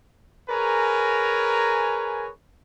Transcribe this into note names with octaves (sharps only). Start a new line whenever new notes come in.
G#4 A#4 B4 C#5 G#5 A#5